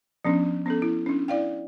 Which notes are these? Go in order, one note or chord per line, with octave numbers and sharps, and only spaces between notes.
F3 B3 C#4 D4
B3 C#4 A4
E4
C#4 D4
E4 D5 F5 G5